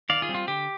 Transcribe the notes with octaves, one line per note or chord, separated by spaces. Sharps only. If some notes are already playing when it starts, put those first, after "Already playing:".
D#3 D5 F5
F4 G#4
G3 C4
F4
D3 G4